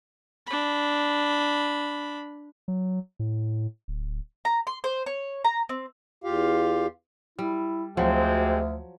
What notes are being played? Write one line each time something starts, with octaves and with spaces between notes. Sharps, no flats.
D4 B5
F#3
A2
D1
A#5
C6
C5
C#5
A#5
C4
E2 F4 G4 F5
G3 E4
D2 C3 F3 F#3 G#3 C4